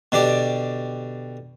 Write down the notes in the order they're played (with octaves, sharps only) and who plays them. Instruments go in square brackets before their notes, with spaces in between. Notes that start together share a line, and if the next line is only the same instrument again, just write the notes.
[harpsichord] B2 D3 G4 D5